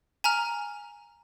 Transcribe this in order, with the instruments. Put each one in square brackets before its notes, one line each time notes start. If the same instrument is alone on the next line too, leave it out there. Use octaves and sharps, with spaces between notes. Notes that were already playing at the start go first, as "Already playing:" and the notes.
[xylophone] G#5 A#5 F6